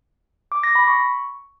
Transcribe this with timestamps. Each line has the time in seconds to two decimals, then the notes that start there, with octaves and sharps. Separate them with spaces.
0.52 D6
0.63 A#6
0.75 B5
0.87 C#6